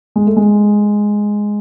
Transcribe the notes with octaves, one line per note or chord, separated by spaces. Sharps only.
G#3
A3
G#3